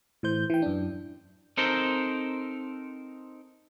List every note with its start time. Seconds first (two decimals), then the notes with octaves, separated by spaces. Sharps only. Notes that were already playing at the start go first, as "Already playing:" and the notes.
0.23 A2 E3 C5 G6
0.50 E3 G5
0.62 F#2 D4
1.57 C4 D#4 A4 A#4 C5